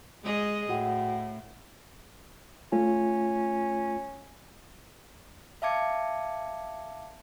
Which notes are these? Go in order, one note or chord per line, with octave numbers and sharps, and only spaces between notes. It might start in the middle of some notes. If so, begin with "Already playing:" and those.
G#3 G#4 D#5
A2 F#4 F#5 G5
A3 C#4 F4
E5 F5 A5 D6 G#6 C#7